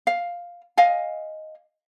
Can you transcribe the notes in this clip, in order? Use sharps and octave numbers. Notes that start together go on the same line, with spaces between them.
F5
D#5 F5 G#5